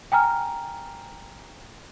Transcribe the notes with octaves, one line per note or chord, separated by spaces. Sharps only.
G5 G#5 A#5 F6